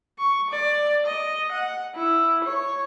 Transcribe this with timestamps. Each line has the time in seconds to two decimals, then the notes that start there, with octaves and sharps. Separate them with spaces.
0.19 C#6
0.50 D5
1.06 D#5
1.52 F#5
1.96 E4
2.44 C#5